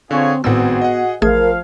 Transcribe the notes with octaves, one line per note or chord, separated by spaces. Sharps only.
D3 C4 F4 G#4 C#5
G#1 A2 B3 C4 F#4 G#4 F#5 E6
D#5 F#5
A1 F3 A3 G#4 A#4 F5 G#6